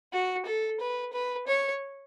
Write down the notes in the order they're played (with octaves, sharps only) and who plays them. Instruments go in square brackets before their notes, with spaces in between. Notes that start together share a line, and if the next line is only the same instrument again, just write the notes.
[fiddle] F#4
A4
B4
B4
C#5